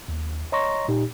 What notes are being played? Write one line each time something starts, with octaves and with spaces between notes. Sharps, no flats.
D#2
C#5 D#5 A#5 C6 C#6 A#6
A#2 D#4 G4